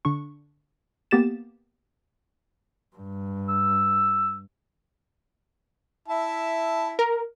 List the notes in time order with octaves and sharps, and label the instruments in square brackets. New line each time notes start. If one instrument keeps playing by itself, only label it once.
[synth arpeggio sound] D3 D4 C#6
A#3 B3 G4 A6 E7
[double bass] G2
[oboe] E6
[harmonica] E4 E5 A5
[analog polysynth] A#4